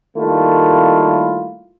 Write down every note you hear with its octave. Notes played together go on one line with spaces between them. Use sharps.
D#3 G3 A3 A#3 E4 F4